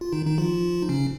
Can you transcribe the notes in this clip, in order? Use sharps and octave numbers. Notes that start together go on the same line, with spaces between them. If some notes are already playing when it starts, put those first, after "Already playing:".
F4
D#3 D#4
D#3 D#4
F3 F4
D#4
C#3 C#4